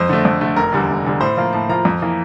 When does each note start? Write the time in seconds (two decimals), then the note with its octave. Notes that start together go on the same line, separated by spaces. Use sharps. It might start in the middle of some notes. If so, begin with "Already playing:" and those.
Already playing: F2 C5
0.09 D3 A3
0.25 F2
0.41 D3 A3
0.56 F1 A#4
0.72 E2 D3 G3
0.89 F1
1.05 E2 D3 G3
1.21 A2 C5
1.37 F3 A#3 F4
1.53 A2 A5
1.69 F3 A#3 F4 A#5
1.85 F2
2.02 E3 A#3